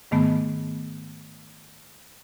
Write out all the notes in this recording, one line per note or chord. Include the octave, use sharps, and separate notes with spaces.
G#2 D#3 A3 B3